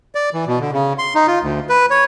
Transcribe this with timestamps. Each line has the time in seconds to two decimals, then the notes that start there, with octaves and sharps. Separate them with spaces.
0.15 D5
0.34 E3
0.47 B2
0.60 D3
0.72 C#3
0.99 C6
1.15 D#4
1.27 F4
1.42 D2
1.69 B4
1.90 C#5